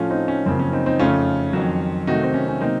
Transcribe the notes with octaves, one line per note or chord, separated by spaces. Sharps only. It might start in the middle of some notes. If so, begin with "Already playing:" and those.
Already playing: A2 F3 A3 C#4 F4
C4 D#4
C#4
F#2 C#3 F3 A#3 C4
C#4
C4 D#4
C4 D#4
F2 C#3 A3 C#4 F4
F2 D#3 F#3
C3 D#3 A3 D#4 F#4
C4
C#4
C#4
C3 F#3 A#3 C4 D#4